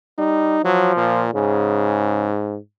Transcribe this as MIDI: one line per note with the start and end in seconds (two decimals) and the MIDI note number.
0.18 0.58 55
0.18 0.59 63
0.64 1.26 53
0.64 0.93 54
0.97 1.34 46
1.34 2.57 44
1.34 2.29 49